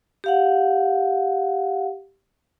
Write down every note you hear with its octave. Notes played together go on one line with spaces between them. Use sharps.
G4 F5 F#5